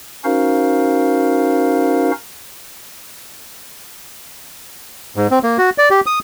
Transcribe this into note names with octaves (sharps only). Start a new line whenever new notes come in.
C#4 D#4 F#4 A#4 C5 F5
G#2
C4
A#3
F#4
D5
G4
D#6